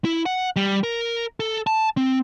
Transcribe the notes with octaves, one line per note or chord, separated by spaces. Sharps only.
E4
F#5
G3
A#4
A4
A5
C4